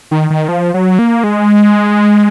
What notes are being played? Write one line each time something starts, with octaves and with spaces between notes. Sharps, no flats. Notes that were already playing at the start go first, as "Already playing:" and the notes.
D#3
D#3
F3
F#3
A#3
G#3